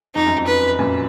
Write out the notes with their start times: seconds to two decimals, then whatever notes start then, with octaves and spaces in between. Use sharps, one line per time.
0.15 F2 D#4
0.26 F#2
0.36 F2
0.47 B4
0.79 F#2 A#2